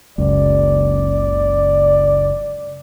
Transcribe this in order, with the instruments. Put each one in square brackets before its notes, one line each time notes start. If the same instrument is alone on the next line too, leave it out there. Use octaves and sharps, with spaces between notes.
[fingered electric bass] F#1 C#2 [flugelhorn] D5